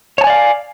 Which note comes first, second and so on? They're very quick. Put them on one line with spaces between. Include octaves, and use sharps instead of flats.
C#5 A5 G#5 D5 F5